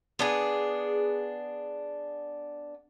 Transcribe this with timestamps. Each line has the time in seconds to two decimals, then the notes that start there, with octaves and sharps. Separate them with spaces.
0.19 B3 D4 G#4